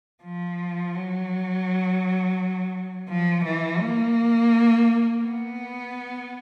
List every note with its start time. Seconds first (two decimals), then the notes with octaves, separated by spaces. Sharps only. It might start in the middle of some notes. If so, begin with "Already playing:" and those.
0.23 F3
0.94 F#3
3.09 F3
3.45 E3
3.80 A#3
5.23 B3